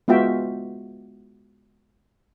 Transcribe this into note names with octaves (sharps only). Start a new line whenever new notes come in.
G#3 B3 F4 F#4 E5 G5